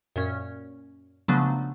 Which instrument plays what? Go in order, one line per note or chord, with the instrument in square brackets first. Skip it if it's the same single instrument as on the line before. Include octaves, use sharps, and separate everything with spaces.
[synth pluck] F#2 A#2 C#4
C#3 F3 F#3 A3 B3 D4